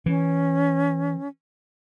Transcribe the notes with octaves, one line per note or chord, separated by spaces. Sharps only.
E3 C#4